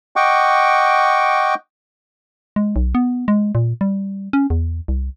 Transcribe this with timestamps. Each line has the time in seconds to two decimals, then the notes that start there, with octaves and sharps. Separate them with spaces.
0.16 D#5 F#5 G5 C#6 D6
2.56 G#3
2.76 B1
2.95 B3
3.28 G#3
3.55 A#2
3.81 G3
4.33 C#4
4.50 E2
4.88 C2